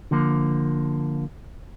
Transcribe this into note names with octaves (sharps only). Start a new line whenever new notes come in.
D3 F3 A#3